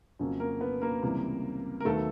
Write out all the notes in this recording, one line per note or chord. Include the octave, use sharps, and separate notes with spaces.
F2 C#3 F#3 A#3 C#4
A#3 A#4
B3 B4
A#3 A#4
C#2 C3 E3 G3
A#4
D#2 D#3 F#3 A3 B3 A4